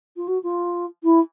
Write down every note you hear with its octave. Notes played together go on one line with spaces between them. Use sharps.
F4
F#4
F4
E4